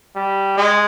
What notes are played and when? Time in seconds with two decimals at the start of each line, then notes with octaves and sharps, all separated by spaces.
0.16 G3
0.57 G#3